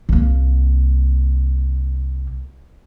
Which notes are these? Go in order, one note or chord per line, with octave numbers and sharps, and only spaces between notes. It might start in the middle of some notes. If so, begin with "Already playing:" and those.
C2 A#3